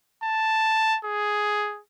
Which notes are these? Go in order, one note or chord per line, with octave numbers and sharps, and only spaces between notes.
A5
G#4